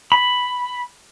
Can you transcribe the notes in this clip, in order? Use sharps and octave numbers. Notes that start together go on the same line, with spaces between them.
B5